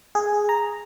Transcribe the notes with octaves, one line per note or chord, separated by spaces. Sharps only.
G#4
A#5